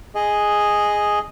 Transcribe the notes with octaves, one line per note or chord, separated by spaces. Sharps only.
G#4 D#5